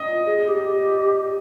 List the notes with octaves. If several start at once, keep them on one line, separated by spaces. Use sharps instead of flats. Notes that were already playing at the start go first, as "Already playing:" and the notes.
Already playing: D#5
G#4
G#4
G4